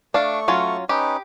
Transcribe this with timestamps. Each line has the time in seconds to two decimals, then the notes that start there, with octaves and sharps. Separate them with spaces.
0.14 A3 D4 F5 C#6
0.48 F#3 C#4 F4
0.89 C#4 D#4 G4 B4